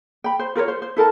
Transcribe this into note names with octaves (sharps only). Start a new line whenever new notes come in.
G5 B5
C5
F4 A#4 B4 C#5
C5
C5
E4 A4 A#4 A5